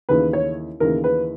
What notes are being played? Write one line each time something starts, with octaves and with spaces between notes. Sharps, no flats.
D#2 C#3 E3 B4
C#5
D#2 C#3 E3 A#4
B4